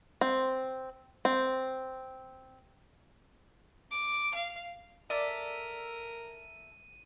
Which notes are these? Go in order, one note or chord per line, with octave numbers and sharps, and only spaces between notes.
C4
C4
D6
F5
A4 A#4 D5 E5 D#7